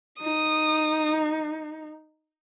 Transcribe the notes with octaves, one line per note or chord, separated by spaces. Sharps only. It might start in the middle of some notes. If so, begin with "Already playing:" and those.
D#4 D#6